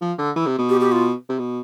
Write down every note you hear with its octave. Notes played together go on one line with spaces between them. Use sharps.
F3
D3
E3
C3
B2
G4
G4
F4
C3
B2